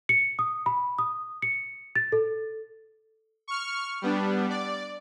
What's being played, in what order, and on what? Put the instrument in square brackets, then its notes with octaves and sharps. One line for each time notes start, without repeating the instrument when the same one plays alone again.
[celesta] C#7
D#6
B5
D#6
C#7
A6
A4
[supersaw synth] C#6 F6
G3 B3 D4
D5